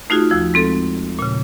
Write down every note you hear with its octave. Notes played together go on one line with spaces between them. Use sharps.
A3 D#4 F4 F#4 G#4
D#2 F3 E6
G#3 C4 A4
A#2 C#3